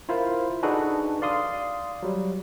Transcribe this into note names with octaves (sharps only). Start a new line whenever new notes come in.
E4 F4 A#4 C5
D4 D#4 F#4 G#4 A4 B4
D5 F5 C6 D#6
F#3 G3